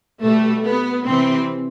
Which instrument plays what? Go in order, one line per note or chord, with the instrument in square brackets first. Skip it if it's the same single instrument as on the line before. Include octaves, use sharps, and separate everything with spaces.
[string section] B2 G3 A3
B3
C3 E3 G3 C4